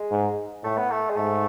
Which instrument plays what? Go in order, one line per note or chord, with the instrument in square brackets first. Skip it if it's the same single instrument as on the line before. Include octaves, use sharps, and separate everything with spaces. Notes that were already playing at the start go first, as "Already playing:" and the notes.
Already playing: [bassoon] G#3
[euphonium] G#2
[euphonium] A2 [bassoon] A3
[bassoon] B3
A3
G#3
[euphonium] G#2 [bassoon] A3